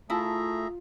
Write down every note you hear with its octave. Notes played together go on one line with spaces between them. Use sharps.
A3 E4 F4 G#4 E5 A5 A#5